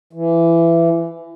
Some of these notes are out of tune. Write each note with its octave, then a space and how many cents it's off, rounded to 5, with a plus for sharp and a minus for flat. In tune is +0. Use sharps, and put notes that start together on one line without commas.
E3 +20